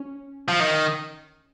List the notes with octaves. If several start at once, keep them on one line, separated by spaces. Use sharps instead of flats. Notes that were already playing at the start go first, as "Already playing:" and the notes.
Already playing: C#4
F3
D#3